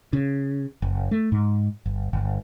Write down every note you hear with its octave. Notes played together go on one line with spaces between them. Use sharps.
C#3
F#1
A3
G#2
G1
G1